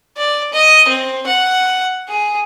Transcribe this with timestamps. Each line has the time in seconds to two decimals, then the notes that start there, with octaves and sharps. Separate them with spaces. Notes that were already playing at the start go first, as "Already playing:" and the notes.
0.17 D5
0.53 D#5
0.88 C4
1.27 F#5
2.09 G#4